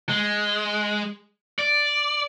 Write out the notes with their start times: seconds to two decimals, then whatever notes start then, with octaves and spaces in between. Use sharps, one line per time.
0.09 G#3
1.59 D5